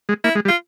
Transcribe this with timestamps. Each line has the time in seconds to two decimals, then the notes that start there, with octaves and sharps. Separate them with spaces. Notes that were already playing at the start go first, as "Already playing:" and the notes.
0.09 G#3
0.24 A#3 E4
0.35 G#3
0.45 G3
0.48 F4